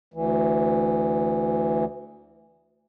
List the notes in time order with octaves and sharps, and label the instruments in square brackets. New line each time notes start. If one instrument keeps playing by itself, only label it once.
[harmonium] D2 E3